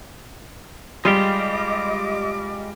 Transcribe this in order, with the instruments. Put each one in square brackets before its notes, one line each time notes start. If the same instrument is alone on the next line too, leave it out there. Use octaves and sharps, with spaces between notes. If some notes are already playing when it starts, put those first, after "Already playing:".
[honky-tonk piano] G3 [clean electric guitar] G#3 F4 G4 [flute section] D#5 D6